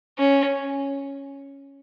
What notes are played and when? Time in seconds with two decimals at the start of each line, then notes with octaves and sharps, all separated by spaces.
0.18 C#4